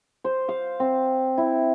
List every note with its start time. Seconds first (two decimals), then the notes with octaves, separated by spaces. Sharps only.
0.24 C5
0.48 F5
0.80 C4
1.38 E4